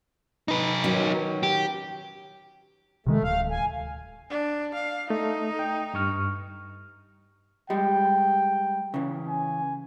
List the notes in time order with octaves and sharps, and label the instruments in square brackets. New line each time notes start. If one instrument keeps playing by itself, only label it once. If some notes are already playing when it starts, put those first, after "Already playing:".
[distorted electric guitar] D#4 B4
[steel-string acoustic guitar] D#3 F#3 C#4
[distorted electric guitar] G4
[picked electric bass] C3 D#3 G#3 [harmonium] A3
[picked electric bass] D1 [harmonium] F5
[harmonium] G#5
[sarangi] D4
F5
[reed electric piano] A3 [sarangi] D#4
[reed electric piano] G5
G2 C#6 F6
[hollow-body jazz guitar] G3 G#3 [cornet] G5
[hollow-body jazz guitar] C#3 E3
[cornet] G#5